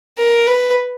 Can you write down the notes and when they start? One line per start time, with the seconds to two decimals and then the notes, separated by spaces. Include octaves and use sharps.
0.18 A#4
0.47 B4